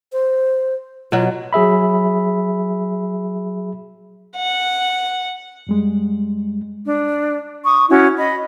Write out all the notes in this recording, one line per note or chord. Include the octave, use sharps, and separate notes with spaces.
C5
B2 F#3 F4
F#3 G#4 E5 B5
F#5
F#2 G3 G#3
D4
C#6 D#6
C#4 E4 F#4 C#5
D#5 B5